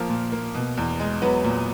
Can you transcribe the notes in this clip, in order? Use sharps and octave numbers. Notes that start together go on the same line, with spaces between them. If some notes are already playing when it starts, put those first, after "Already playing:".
Already playing: F3 A#3 A#4
A#2
A#3
B2
E2
G#3
F#3 B3 B4
A#2